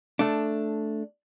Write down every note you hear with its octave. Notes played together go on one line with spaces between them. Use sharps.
A3 D4